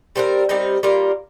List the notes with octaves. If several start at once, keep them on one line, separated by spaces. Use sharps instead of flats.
G3 C4 D#4 A#4
G3 C4 D#4 A#4
G3 A#3 F4 A#4